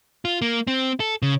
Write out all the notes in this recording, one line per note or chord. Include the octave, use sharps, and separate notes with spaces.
F4
A#3
C4
A4
C#3